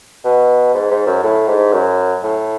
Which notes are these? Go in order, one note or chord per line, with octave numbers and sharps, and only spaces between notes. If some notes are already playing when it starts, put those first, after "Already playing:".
B2
G#2
G#2
F#2
A2
G#2
F#2
A2